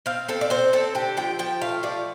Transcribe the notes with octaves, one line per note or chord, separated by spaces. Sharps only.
C4 F5
C4 A4
D5
C4 C5
C4 A4
D3 G4
F3 G5
F3 G5
A3 F5
F3 D5